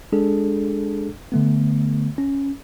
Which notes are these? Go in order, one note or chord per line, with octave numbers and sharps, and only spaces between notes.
G#3 D4 G#4 A4
D3 A3 B3
C#4